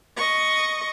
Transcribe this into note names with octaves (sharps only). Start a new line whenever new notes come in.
D#5 C#6